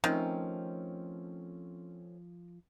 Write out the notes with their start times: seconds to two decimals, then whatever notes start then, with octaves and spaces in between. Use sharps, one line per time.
0.04 D#3 F3 A3 C4 C#4